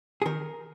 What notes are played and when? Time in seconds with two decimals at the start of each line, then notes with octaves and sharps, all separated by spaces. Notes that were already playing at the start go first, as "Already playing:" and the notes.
0.22 G#4
0.25 D#3 A#4